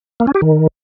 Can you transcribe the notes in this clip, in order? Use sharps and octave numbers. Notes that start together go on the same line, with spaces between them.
A#3
C#4
G4
D#3